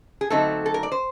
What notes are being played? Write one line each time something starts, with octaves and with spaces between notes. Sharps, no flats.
G#4
D3 F#3 A3 C4 D#4 A4
A4
A#4
D5
C5